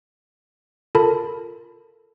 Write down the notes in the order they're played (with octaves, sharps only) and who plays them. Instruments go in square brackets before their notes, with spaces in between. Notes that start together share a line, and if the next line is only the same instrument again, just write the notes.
[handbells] F4 A4 A#4 A5 B5